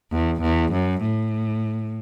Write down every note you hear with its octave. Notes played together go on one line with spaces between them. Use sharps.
E2
E2
F#2
A2